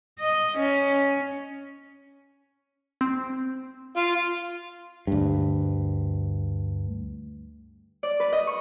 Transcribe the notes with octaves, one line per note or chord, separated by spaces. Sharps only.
D#5
C#4
C4
F4
D2 G2
D5
B4
D#5
C#6